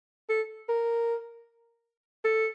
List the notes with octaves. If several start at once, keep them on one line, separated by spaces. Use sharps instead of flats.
A4
A#4
A4